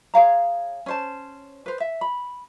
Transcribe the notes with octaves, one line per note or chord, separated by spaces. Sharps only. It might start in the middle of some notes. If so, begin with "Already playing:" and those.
G#4 C#5 F5 A#5
C#4 C5 A5
B4 C5
E5
B5